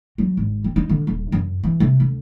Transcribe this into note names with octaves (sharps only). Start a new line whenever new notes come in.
F#3
G#1
C4
D#4
D3
D#1
F#2
E3
C3
D2